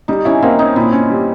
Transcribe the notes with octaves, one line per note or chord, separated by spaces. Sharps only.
G3 D#4
C#4 E4
A#3 C4
C#4 D#4
A#2 E4
C#4
G3